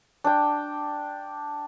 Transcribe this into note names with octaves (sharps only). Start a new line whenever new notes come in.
D4 G5